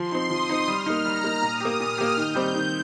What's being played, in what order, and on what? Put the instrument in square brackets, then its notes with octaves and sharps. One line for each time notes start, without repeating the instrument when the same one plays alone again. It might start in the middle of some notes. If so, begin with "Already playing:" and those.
Already playing: [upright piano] F3 [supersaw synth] C6
[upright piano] C4 D#4
[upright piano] F3 [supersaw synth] D#6
[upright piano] C4 D#4
[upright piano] G3 [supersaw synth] F6
[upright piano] A#3 D#4
[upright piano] G3 [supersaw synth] A#5
[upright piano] A#3 D#4
[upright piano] A#2 [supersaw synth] D#6
[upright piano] A#3 G4
[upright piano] A#2 [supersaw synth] F6
[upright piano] A#3 G4
[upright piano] D#3 [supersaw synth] G6
[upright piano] G3 C4 D#4 G4
D#3